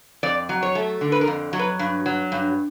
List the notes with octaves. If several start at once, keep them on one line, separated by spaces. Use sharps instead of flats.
F2 D5
F#3
C#5
A3
D3
B4
A#4
F2
F#3
B4
G2
F#3
G2